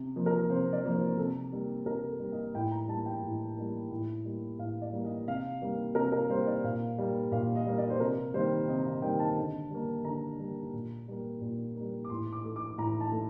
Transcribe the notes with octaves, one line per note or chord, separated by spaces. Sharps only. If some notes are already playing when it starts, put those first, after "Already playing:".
Already playing: C3
F3 A#3
A#4
C3 C5
D5
F3 A#3
C5
C3 A4
G3 A#3
C3 A#4
A4
G3 A#3
D#5
A2 G5
A#5
G3 A#3 A5
G5
A2
G3 A#3
A2
G3 A#3
A2 F5
D5
G3 A#3
D#5
C3 F5
G3 A#3
C3 A#4
A#4
G3 A#3 C5
D5
A#2 F5
G3 A#3
A#2 F5
D#5
G3 A#3
D5
C5
C3 A#4
D#3 G3 A#3 C5
C3 D#5
D#5
D#3 G3 A#3 G5
A5
D3
G3 A#3
D3 A#5
G3 A#3
A#2
G3 A#3
A#2
A#3
G3
D6
A2 C6
D6
A3
D6
A2 A#5
A5
A3